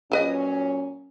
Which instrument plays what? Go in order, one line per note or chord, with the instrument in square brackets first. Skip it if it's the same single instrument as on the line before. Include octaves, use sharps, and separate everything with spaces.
[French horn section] A#2 F#3 C#4 [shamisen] F3 B4 D#5